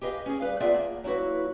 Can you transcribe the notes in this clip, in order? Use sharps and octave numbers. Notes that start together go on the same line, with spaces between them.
G4 G#4 B4 D#5 F5
C#4 G#4
G3 B4 F5
B3 F4 G#4 D5 E5 A5
A#3
F#3 A#3 E4 F#4 B4